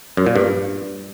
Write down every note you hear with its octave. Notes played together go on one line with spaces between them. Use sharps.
F#2
A#2
G2